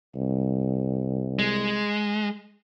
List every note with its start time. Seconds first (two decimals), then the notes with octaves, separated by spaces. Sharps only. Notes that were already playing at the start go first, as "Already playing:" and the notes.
0.15 C2
1.39 G#3